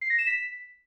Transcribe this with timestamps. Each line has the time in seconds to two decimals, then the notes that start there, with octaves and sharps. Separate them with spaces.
0.01 C7
0.10 A#6
0.19 E7
0.27 B6